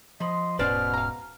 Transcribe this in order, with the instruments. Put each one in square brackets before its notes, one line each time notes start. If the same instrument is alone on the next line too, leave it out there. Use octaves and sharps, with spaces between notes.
[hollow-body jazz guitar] F3 B5 [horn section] D#5 C6
[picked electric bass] D#1 G#2 C#4 [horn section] B2 [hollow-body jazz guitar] B4 C5 D5 [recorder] F6
[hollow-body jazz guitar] F5 A#5